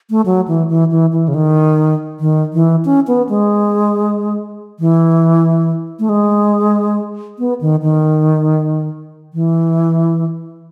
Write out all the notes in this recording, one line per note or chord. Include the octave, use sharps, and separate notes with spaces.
A3
F#3
E3
E3
E3
E3
C#3
D#3
D#3
E3
C#4
B3
G#3
E3
A3
G#3
B3
D#3
D#3
E3